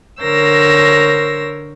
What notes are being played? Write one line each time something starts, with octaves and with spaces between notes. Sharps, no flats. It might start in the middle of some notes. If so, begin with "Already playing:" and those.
D3 A#4 C5 C#5 E6 A#6